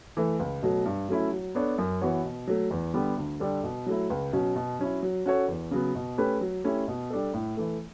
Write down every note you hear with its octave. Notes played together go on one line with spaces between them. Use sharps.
E3 A3
C#2
B2 F#3 A3
G2
F#3 A3 C#4 E4
F#3
B3 D4 A4 C#5
F#2
E3 B3 F#4 C#5
B2
F#3 A3
E2
D3 G3 B3
D2
D3 G3 D4 A4
B2
F#3 A3 E4
C#2
B2 F#3 C#4
B2
F#3 C#4 E4
F#3
C#4 F#4 A4 C#5
E2
C#3 F#3 B3
B2
A3 C#4 G4 B4
F#3
A3 C#4 E4 G4
B2
G3 D4 A4
A2
E3 A3